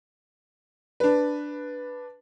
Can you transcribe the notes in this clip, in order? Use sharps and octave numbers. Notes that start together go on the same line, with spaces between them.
D4 B4